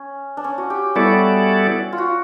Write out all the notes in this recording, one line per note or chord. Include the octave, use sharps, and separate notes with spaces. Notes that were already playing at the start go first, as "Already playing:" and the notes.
Already playing: C#4
D4
C#4
F#4
G4
G3 B3 E4 F#4 A4 D5
F4
F#4